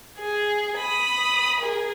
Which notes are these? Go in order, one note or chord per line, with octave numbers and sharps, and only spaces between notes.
G#4
B5 D#6
G#4 A#4